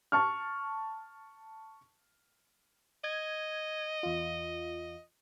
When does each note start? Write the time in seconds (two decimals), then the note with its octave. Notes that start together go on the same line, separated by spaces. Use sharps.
0.12 A5 C#6 F6
3.04 D#5 G#6
4.03 E2 F4